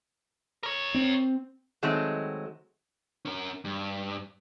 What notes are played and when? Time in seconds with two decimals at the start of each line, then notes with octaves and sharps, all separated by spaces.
0.63 A#4 C#5
0.94 C4
1.82 D#3 F#3 G#3 A3 C4
3.25 C#4 A#4
3.65 G2